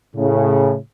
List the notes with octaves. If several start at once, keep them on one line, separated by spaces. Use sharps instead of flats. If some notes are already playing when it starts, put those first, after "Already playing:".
A2 C#3